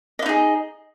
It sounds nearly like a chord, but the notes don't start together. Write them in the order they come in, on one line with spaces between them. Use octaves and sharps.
D#5 E4 D#4 G#4